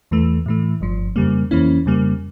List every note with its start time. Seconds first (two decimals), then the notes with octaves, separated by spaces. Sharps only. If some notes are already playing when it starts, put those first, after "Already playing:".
0.11 E2 E3 A3
0.46 A2 E3 A3
0.80 G1 G2 F3
1.16 F2 C#3 G3 A#3
1.51 F2 E3 A#3 C#4 E4
1.86 F2 C#3 G3 A#3